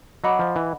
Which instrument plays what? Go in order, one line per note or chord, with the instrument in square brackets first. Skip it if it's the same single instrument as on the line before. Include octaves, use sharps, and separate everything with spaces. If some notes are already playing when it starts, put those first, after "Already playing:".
[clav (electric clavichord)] F#3 [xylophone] D#5 F#5 B5 D6
[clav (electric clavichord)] F3
E3